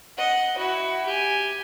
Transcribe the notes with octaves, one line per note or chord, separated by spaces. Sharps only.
D#5 F#5
E4 F#4
G4 G#5